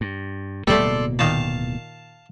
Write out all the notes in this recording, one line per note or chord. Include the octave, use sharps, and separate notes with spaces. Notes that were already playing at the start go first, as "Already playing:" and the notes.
G2
D1 B2 G3 A3 A#3 A4 D5 C6
A#2 D#3 F5 A5